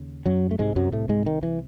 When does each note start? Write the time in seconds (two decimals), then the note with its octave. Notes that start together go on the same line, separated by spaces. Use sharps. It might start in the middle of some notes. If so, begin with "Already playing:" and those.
Already playing: D#2 C#3
0.26 F#2 F#3
0.51 A3
0.59 C2 G#2 C3 G#3
0.76 F#2 F#3
0.92 A2 A3
1.09 G#2 G#3
1.26 D#3
1.43 E3